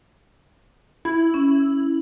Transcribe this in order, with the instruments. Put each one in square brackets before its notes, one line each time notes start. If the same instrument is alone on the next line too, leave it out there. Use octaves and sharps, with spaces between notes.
[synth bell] E4
[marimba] C#4